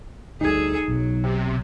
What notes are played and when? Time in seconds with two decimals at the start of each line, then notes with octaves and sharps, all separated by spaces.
0.41 D2 F#3 G3 D#4 G#4 A4 G#6
0.88 B1 F#3
1.24 C3